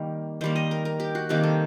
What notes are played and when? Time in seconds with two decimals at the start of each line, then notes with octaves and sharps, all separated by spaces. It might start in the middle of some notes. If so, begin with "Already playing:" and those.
Already playing: D#3 G3 A#3
0.41 D#3 G3 A#3 C5
0.56 D#5
0.71 A#4
0.85 A#4
1.00 G4
1.15 F#4
1.29 C3 D#3 G3 A#3 G4
1.43 A4